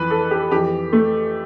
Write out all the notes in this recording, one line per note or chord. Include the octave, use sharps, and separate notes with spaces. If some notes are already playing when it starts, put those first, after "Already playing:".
Already playing: F2 E3 B4
A4
G4
F2 E3 G4
A3